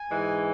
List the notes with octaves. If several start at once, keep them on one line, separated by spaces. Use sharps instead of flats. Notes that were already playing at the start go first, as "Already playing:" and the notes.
Already playing: G#5
G#2 E3 G#3